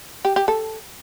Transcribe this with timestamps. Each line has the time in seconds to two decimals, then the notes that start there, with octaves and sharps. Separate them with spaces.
0.25 G4
0.36 G4
0.48 A4